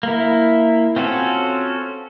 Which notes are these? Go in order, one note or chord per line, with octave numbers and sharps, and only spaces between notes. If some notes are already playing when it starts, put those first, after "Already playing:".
A#3 E4
C4 C#4 F4 F#4 A4